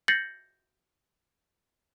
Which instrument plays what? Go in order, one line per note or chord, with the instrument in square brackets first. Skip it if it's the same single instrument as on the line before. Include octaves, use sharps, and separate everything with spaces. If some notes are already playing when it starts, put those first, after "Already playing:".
[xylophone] G6 A6 A#6 C7 C#7 F#7